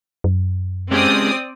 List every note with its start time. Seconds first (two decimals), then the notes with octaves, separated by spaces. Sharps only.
0.24 F#2
0.91 G#3 C4 C#4 G4 D5 D#6